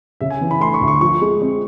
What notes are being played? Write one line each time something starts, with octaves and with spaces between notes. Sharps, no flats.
C#3 E5
G#5
E3
B5
A3 C6
C#6
D2
C#6
F3 C#6
G#3
C4